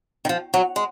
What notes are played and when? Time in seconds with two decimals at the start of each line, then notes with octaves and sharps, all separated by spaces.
0.25 D#3
0.29 F3
0.54 F#3
0.76 G#3